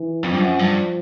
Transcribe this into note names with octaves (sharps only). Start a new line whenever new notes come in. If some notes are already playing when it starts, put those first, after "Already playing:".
Already playing: E3
F2 F3
G2
F#2
G2